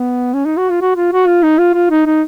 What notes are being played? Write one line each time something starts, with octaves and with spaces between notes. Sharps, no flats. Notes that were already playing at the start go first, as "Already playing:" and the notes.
Already playing: B3
C#4
D#4
F#4
F4
F#4
F4
F#4
F4
D#4
F4
F4
D#4
D#4